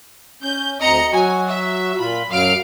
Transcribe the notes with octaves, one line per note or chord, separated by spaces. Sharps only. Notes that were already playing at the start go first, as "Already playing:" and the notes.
C#4 G6
D2 C4 D#5 A#5 C#7
F#3 F#4 G#5
E5
A#2 F4 B5
F#2 F#3 F5 F6 D7